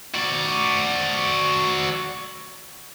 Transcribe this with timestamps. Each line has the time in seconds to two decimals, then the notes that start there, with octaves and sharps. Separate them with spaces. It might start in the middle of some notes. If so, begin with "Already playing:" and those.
0.14 F#4 D5